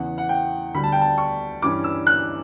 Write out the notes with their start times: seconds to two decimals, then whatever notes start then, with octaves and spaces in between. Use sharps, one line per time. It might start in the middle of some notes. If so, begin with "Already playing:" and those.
Already playing: E2 C#3 E3 F#5
0.18 F#5
0.29 G5
0.74 D2 D3 G3 D4 B5
0.83 A5
0.92 G5
1.01 A5
1.18 C#6
1.62 G2 E3 G3 C#4 D6
1.84 E6
2.07 F#6